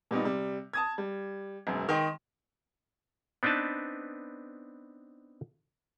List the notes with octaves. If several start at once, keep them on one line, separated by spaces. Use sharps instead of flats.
A#2 G3 B3 D#4
C3 G3
A5 D#6 G#6
G3
E1 F#2
D#3 D#5 G5 C6
B3 C4 D4 D#4 B4 A5